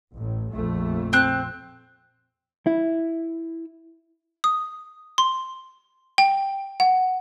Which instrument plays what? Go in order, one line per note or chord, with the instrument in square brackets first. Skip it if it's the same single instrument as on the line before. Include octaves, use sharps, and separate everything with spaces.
[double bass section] A1 A2
A#1 F2 A3
[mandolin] C4 F#6
[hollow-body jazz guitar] E4
[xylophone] D#6
C6
G5
F#5